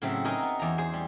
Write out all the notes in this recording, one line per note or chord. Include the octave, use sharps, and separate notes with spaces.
A2 C#3 F#3 C4 E5
D#4 F#4 G#4 A#4 D#5 E5
B3
E2 A#5
G#4 C5
G3